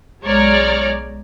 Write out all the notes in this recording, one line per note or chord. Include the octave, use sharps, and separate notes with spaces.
B1 G#3 C#5 D5 A#5 F6